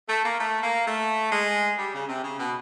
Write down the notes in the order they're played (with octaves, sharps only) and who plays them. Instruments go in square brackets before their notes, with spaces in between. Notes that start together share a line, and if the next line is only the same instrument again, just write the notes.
[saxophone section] A3
A#3
A3
A#3
A3
G#3
G3
C#3
C3
C#3
B2